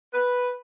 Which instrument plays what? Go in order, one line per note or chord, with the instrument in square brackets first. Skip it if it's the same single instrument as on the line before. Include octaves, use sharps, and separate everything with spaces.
[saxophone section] B4